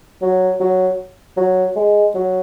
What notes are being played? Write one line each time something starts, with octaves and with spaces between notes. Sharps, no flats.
F#3
F#3
F#3
G#3
F#3